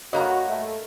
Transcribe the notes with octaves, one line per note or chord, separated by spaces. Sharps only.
G2 A#3 F#4 C#5 D#5 A#5
A3